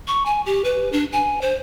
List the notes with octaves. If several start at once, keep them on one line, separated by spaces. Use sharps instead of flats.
C#6
G#5
G4
B4
D4
G#5
C5